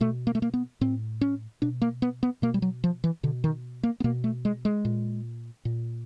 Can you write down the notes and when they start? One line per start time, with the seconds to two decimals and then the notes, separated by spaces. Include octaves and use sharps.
0.01 B2 A3
0.27 A#3
0.35 A3
0.42 A#3
0.54 B3
0.81 A2 C4
1.21 C#4
1.62 B2 D4
1.82 A#3
2.02 B3
2.23 B3
2.42 B2 A#3
2.54 G3
2.62 F#3
2.84 F3
3.04 E3
3.23 B2 D3
3.44 D#3
3.83 A#3
4.00 B3
4.04 B2 A#3
4.24 A3
4.45 G#3
4.65 G#3
4.85 A#2
5.65 A#2